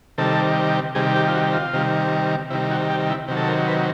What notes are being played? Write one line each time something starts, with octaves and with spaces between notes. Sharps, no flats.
C3 D#3 G3 A4
C3 D#3 G3 G#4
G4
F4
F#4
F4
C3 D#3 G3
C3 D#3 G3 E4
F#4
G4
E4
C3 D#3 F#3
A4
A#4
B4